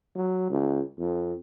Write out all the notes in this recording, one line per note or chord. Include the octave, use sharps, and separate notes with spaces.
F#3
C#2
F2